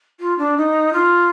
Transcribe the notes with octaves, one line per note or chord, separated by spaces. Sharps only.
F4
D4
D#4
F4